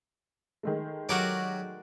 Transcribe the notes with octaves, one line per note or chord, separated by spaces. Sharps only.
D#3 G#3 A3
F#3 F#4 G4 A#4 D5 D#5